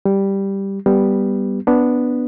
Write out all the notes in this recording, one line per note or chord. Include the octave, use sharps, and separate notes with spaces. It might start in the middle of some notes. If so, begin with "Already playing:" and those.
G3
G3 B3
B3 D4